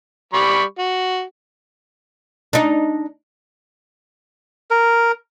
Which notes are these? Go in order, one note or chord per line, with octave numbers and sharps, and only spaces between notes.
G3 B5 C#6
F#4
D4 D#4
A#4